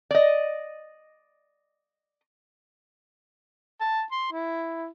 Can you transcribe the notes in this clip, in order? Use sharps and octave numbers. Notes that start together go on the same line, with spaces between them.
D5 D#5
A5
C6
E4